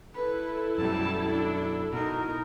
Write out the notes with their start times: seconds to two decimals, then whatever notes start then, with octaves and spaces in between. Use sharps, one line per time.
0.15 E4 A4 B4
0.78 F#2 B2 G3 A5
1.30 D4
1.93 B2 D#4 A#4